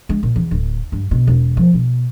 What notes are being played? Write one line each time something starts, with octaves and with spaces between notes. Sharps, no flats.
G#3
A#2
E2
D1
G2
B2
E1
F3
B2